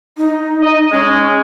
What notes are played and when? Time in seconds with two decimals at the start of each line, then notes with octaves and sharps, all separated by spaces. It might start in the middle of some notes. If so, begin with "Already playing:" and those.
0.17 D#4
0.63 D#5
0.92 G#3 C#4